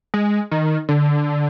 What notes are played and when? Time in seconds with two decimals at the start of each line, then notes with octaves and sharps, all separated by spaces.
0.14 G#3
0.51 D#3
0.89 D3